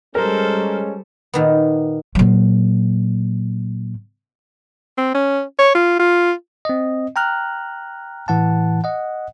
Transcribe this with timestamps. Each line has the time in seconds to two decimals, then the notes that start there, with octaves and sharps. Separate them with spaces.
0.15 G3 G#3 C#4 A4 A#4 C5
1.34 A#2 D#3 B3
2.15 A#2 F#3
4.98 C4
5.14 C#4
5.59 C#5
5.75 F4
5.99 F4
6.65 C4 D#5
7.16 G5 A#5 F6 F#6
8.28 A2 E3 F#5 A5
8.84 D#5 F#5